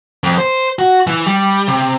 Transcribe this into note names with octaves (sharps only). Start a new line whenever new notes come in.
F2
C5
F#4
E3
G3
C3